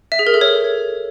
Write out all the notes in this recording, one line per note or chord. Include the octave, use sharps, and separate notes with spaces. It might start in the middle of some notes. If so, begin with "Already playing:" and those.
E5
G#4
A#4
A4
C#5